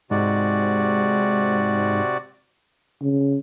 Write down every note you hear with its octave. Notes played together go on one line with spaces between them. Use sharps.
G#2 C3 F#4 D5
C#3